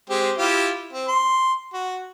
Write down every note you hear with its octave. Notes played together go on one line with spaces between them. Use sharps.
G#3 C4 G4
E4 F4 G4
C4
C6
F#4